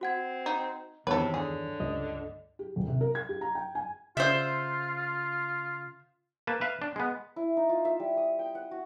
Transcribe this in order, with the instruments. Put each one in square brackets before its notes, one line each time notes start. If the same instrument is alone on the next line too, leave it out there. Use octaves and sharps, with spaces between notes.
[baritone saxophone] C4 [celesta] F#4 F#5 G#6
[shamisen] D#4
[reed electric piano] E2 G2 D#3 [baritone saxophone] C3 [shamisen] A4 B4 [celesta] C#5
[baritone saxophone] D3 [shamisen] G#4
[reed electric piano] C#2 G2 D#5
[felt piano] G4
D#1
C3
A#4
G#6
G4
A#5
G5
G#5
[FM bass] C#3 [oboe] F4 [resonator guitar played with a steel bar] C5 E5
[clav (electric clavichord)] A#3 B4 A5
B4 E5 F5
D4
G#3 B3
[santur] E4
D#4
F4
E5
G3
D#6
G5
F#5
F#4